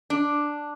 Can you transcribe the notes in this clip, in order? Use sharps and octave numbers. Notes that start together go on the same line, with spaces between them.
D4